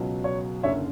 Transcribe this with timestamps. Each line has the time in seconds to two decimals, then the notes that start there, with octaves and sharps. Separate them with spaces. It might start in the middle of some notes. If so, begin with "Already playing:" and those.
Already playing: C#2 B2 F#3
0.24 C#5
0.63 F#1 F#2 D3 C#5 E5